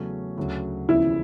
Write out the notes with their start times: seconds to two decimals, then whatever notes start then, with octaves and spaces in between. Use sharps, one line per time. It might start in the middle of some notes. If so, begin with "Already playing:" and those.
Already playing: E2 C#3 F#3 A3 C#4
0.37 D2 C#3 F#3
0.89 E2 C#3 F3 E4